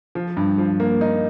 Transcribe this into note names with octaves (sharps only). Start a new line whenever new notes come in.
F3
G2
F3
A#3
D#4